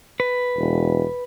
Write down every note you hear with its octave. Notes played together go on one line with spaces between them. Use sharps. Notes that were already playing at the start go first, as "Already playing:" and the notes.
B4
E1